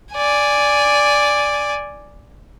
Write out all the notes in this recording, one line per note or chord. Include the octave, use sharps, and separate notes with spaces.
D5 G#5